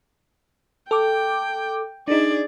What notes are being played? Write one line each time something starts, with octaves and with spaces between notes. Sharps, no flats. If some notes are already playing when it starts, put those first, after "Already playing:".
A4 G5 D6
D4 D#4 G#4 D5